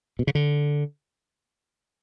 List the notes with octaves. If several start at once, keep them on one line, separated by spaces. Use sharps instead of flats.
B2
C#3
D3